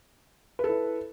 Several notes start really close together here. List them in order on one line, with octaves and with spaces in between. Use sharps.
B4 A4 E4